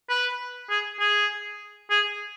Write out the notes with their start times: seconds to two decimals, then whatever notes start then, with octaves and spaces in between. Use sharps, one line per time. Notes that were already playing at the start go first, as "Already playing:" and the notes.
0.09 B4
0.70 G#4
1.00 G#4
1.90 G#4